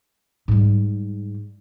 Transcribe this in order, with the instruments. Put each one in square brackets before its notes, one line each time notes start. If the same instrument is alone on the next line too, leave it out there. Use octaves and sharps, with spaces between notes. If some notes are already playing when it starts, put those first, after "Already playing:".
[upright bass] G#2 G3